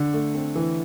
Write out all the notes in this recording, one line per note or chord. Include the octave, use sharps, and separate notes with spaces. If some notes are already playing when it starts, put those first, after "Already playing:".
Already playing: D3
A3
C4
E3